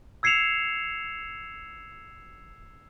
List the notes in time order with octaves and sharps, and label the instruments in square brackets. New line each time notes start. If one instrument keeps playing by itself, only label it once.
[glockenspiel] E6 G#6 C7 C#7 E7 F7